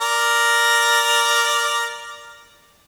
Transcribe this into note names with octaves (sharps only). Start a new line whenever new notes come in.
A#4 D5 A#5